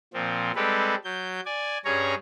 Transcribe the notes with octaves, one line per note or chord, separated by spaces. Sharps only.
A#2 F3 C4
G3 G#3 C4 G4 A4 B4
F#3 G6
D5 G#5
G2 C#4 G#4 C#5 A#5